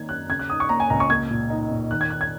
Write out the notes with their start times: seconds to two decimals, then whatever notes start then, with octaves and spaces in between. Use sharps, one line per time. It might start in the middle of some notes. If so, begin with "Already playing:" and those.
Already playing: D#3 A#3 D#4 G#6
0.09 F#2 F#6
0.29 C#3 G#6
0.39 F#6
0.50 D#4 D#6
0.60 C#6
0.69 A#3 A#5
0.80 G#5
0.90 C#2 A#5
1.00 C#6
1.10 A#3 G#6
1.31 A#2
1.50 D#4
1.71 A#2
1.91 D#3 F#6
2.01 G#6
2.10 D#4 F#6
2.21 G#6